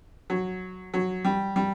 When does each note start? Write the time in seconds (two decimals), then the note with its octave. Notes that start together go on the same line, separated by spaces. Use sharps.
0.30 F#3
0.94 F#3
1.24 G3
1.56 G3